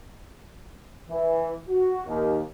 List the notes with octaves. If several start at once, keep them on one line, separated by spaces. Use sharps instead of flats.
E3
F#4
D#2